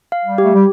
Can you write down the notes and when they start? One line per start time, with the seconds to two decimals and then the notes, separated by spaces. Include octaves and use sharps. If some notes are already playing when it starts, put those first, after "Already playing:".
0.12 F5
0.25 G3
0.38 G4
0.44 A3
0.54 G3